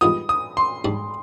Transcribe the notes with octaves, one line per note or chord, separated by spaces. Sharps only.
G2 D#3 G#3 B3 F4 D#6
D#6
C6
G#2 G3 D4